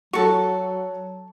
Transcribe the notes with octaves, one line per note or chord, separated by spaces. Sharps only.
F#3 F#4 A4 A5 C#6